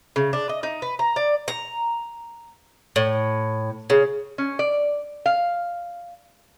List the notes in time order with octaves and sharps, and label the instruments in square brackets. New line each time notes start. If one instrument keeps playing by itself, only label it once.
[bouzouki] C#3
D4
D#5
D#4
B4
A#5
D5
A#5
A2
C#3
[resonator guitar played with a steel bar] C#4
D5
F5